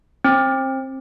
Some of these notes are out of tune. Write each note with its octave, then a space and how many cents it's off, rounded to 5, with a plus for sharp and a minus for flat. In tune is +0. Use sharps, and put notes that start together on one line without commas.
C4 +25